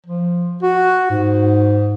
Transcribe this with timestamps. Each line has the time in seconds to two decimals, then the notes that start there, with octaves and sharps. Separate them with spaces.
0.06 F3
0.62 F#4
1.10 G#2